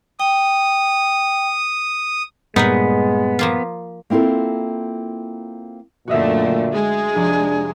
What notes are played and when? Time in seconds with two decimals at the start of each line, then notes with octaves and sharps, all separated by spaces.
0.20 G5 D#6
2.56 G2 A#2 G#3 B3 D#4 A#4 B4
3.39 F3 A#3 F4
4.10 A#3 C4 E4 F4 A4
6.08 F#2 A#2 D3 A3 F#4 D#5 E5
6.73 G#3 G#4
7.15 F1 D4